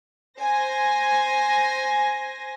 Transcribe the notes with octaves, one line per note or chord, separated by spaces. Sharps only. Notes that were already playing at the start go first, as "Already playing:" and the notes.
C5 G#5 A#6